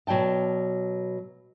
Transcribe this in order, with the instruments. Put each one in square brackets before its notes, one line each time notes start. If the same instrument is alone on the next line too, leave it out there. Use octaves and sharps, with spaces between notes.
[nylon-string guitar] B2 F#3 D5 G5 A5